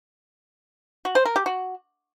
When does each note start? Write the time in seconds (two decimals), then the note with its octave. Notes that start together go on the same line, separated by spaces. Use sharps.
1.05 F#4
1.15 C5
1.25 A#4
1.36 G4
1.46 F#4